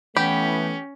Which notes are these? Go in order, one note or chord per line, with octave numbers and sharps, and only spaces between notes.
E3 A3 B3 C#4 G4 G5 B5